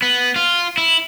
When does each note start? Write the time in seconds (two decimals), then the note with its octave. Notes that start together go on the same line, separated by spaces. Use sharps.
0.02 B3
0.36 F4
0.78 E4